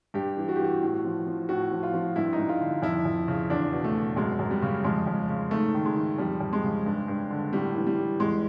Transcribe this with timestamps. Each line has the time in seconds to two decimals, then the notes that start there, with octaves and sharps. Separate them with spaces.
0.14 G2 G4
0.37 E3
0.49 F#4
0.56 G4
0.59 E3
0.64 F#4
0.82 A2
1.05 F3
1.27 F3
1.49 A2 F#4
1.71 F3
1.83 F4
1.94 F3
2.16 G2 E4
2.33 D#4
2.38 G2
2.49 F4
2.61 D3
2.82 F2 E4
3.05 F2
3.28 C#3
3.50 E2 D4
3.72 B2
3.84 A3
3.95 B2
4.17 F#2 G#3
4.39 F#2
4.51 G3
4.62 C#3
4.84 F2 G#3
5.07 F2
5.29 C#3
5.51 G#2 A3
5.74 D#3
5.85 G#3
5.96 D#3
6.18 F2 G3
6.41 F2
6.53 G#3
6.64 C#3
6.86 G2
7.08 G2
7.30 D3
7.53 A2 G3
7.75 E3
7.87 G3
7.97 E3
8.20 E2 G#3